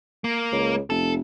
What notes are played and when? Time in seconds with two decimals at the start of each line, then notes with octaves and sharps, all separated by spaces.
0.24 A#3
0.52 C#2
0.90 F1 A4